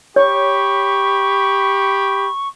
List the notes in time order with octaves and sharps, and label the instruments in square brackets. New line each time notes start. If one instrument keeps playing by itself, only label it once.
[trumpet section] G4 B5 [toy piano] C#5 [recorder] C#6